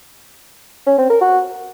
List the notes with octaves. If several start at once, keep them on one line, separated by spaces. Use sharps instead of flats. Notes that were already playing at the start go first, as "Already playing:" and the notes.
C#4
C4
A#4
F#4